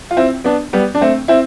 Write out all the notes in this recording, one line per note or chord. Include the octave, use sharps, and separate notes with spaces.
F4
C4 E4
B3 D4
G3 B3
D4
A3 C4
C4 E4